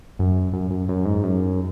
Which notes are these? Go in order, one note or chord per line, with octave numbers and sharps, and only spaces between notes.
F#2
F#2
F#2
F#2
G#2
F#2